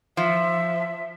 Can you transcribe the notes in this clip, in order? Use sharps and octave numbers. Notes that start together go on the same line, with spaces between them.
F3 E5